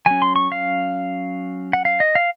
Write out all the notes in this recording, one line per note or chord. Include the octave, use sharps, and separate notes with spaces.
F#3 C#4 G#5
C6
C#6
F5
F#5
F5
D#5
F5